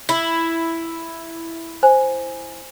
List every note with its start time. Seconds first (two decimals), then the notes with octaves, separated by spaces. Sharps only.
0.09 E4
1.83 C5 G#5